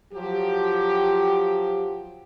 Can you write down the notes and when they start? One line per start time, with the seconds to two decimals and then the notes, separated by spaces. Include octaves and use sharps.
0.13 F3 F#3 G4